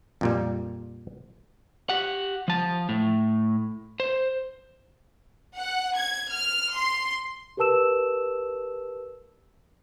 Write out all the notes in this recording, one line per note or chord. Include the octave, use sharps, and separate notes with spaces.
F2 A#2 G3
G4 F#5
F3 A5
A2
C5
F#5
G#6
F6
C6
G4 A#4 B4 A5 E6 E7